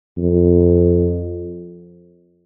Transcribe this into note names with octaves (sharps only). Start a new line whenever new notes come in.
F2